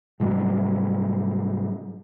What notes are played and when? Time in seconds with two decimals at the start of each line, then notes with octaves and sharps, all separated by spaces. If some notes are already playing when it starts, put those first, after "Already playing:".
0.20 G#2 C3 F#3 G3